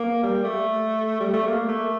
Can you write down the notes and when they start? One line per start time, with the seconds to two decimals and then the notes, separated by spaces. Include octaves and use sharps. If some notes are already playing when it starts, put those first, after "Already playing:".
Already playing: A#3
0.23 G3
0.44 A3
1.20 G3
1.33 A3
1.48 A#3
1.68 A3